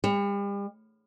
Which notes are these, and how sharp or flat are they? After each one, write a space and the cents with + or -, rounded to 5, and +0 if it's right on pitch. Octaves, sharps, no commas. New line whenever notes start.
G3 +40